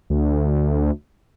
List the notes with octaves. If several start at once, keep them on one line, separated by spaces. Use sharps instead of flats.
D2